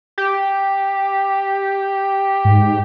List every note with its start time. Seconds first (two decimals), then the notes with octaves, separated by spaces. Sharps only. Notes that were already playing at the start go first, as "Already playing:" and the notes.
0.18 G4
2.45 G#2